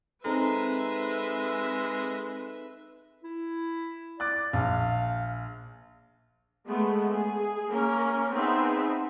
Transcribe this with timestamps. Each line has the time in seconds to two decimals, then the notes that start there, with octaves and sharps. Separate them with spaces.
0.25 G#3 C4 D#4 A4 B4 E5 A#5 F6
3.24 E4
4.20 D5 D6 F#6
4.53 A#1 F5
6.68 G#3 A3 B3
7.13 G#4
7.70 A#3 C#4 A#4
8.32 B3 C4 D#4 G#4 B4 E5